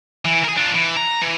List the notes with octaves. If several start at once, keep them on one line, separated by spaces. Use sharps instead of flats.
E3
G#4 A#4
D4 F4
E3
A#5
E3